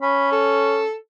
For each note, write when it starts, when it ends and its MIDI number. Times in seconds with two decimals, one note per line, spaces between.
0.02 0.82 61
0.02 0.28 83
0.32 0.95 69